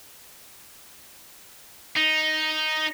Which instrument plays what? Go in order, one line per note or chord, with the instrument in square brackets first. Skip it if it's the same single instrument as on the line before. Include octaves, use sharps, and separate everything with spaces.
[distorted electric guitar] D#4